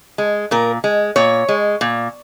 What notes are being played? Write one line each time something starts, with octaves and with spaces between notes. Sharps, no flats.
G#3
A#2 A#4
G#3
A#2 C#5
G#3
A#2